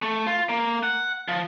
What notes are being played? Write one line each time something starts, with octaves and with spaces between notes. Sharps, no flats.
A3
F4
A#3
F#5
F3